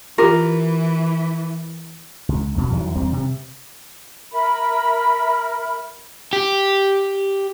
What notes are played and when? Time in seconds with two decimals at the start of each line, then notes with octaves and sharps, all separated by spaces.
0.18 E3 F4 G4 A#4
2.29 C#2
2.58 F2 B2
2.72 E2 D#3 E3 F#3
2.95 E2 G3 C4
3.12 C3
4.33 A#4 E5 B5
6.33 G4